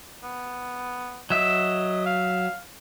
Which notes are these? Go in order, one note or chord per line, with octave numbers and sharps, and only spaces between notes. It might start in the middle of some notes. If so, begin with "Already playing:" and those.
B3
F#3 D#5 E5
F5